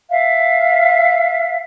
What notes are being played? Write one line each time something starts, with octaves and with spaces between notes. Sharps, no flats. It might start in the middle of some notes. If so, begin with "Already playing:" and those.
E5 F5